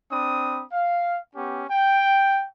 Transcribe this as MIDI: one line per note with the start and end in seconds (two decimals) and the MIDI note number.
0.12 0.63 60
0.12 0.63 62
0.12 0.63 83
0.12 0.63 87
0.72 1.19 77
1.36 1.64 59
1.36 1.64 61
1.36 1.64 67
1.69 2.46 79